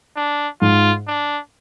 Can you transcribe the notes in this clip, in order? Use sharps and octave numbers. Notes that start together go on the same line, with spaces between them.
D4
G#2 F4
D4